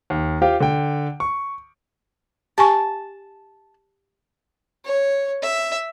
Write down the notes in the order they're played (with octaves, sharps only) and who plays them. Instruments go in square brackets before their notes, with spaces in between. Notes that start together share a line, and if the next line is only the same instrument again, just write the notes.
[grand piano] D#2
F4 G4 C5 F5 G5
D3 G5
C#6
[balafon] G4 G#5 C#6 [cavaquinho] A5
[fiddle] C#5
E5